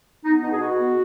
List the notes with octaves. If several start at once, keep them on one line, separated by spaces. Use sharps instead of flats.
B3 D#4
B2 D#4
G#4
B2 F#4
B3